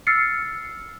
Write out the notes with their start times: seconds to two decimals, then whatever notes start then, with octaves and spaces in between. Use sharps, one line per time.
0.07 E6 F6 A6 C7 C#7